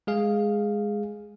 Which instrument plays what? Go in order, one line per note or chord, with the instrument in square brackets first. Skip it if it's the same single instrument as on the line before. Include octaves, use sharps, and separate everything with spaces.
[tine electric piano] G#3 G#4 F5